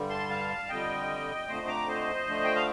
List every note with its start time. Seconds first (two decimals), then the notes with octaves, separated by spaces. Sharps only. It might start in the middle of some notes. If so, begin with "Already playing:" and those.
Already playing: G2 D3 G3
0.09 A5 C6
0.29 F5 A5
0.68 F2 D3 G3 D#5 G5
1.47 F2 D3 A3 C5 D#5
1.67 A#5 D6
1.88 C5 D#5
2.27 D3 F3 A3
2.45 G5
2.55 F5